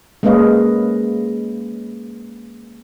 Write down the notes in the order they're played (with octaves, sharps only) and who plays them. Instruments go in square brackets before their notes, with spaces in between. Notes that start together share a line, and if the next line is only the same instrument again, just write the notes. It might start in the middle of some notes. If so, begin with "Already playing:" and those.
[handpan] G#3 A#3 C#4 B4 D#5 F5